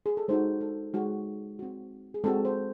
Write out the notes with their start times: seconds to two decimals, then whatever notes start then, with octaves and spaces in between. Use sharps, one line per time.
0.06 G#4
0.17 A4
0.28 G#3 D#4 F#4 C5
0.61 A4
0.93 G#3 D#4 F#4
1.59 C4 F#4
2.14 G#4
2.24 G#3 C4 F#4 A4
2.45 C5